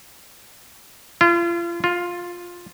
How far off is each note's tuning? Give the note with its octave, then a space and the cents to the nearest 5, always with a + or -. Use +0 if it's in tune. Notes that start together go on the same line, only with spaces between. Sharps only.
F4 -35
F4 +10